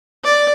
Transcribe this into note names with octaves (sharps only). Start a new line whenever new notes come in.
D5